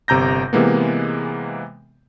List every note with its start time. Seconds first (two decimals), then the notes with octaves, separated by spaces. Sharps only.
0.08 G1 C3 A#5 G6 A#6
0.53 C3 E3 G#3 A#3 B3